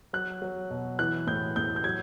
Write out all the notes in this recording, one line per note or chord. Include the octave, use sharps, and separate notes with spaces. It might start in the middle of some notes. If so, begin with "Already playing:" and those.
F#3 F#6
F#3
B2
E3 F#6
A2 G6
A2 G6
G6
F#3 G#6